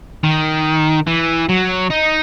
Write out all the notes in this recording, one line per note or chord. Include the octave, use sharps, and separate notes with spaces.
D#3
E3
F#3
D#4